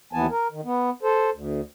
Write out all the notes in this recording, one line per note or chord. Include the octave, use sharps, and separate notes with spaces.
D#2 E3 B3 G#5 A5
A#4
D#3
B3
A4 C5
D2